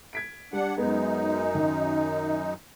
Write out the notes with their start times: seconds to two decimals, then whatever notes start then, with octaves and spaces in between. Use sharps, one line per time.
0.13 G#6 B6 D7
0.53 G3 D4 F#5
0.77 F#2 G#3 B3 D#4
1.55 D#3